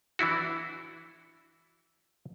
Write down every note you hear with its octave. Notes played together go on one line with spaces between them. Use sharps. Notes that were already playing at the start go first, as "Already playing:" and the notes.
E3 D4 E4 F#4